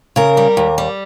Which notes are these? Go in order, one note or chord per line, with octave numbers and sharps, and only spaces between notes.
C#3 A#4
G3
D#2
G3